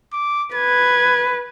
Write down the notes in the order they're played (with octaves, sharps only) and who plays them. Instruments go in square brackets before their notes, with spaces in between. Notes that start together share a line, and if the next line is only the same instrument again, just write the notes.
[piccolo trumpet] D6
[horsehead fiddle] B4 [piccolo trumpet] G#6